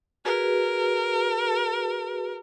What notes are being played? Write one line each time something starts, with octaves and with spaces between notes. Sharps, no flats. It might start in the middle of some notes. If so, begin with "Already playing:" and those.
F#4 G#4 A#4 B4